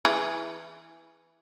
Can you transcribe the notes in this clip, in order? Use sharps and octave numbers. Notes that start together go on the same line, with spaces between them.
E3 G#4